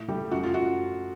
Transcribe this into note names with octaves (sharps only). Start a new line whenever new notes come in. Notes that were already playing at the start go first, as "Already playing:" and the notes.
Already playing: A2
G3 A3 G4
F#2 F#4
F4
F3 F#4